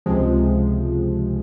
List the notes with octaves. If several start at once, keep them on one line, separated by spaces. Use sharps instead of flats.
C#2 C3 F3 G#3